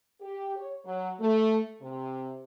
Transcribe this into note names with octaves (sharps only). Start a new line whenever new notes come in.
G4
C#5
F#3
A3
C3